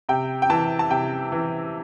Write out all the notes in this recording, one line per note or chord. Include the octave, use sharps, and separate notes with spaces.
C3 G5
G5
E3 A5
A5
C3 G5
E3